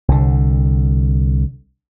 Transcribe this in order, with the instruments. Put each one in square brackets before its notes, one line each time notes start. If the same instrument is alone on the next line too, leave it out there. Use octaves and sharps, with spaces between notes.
[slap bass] C2 D3